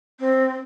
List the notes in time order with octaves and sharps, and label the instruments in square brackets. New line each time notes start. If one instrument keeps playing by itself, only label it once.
[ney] C4